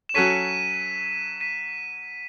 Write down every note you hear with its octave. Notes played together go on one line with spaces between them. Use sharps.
E7
F#3 C#4 F#4 A4 C#5 B6 D#7
B6 D#7